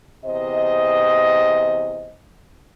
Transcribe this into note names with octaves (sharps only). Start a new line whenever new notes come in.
E2 C3 C5 D#5